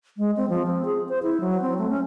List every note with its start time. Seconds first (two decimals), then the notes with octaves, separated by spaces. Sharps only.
0.17 G#3
0.37 C4
0.49 F3
0.66 C4
0.85 G#4
1.09 C5
1.23 E4
1.41 F#3
1.62 C4
1.78 A3
1.90 C#4